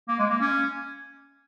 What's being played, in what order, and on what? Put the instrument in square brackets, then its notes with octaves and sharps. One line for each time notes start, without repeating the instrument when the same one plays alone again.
[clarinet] A#3
G#3
A#3
C#4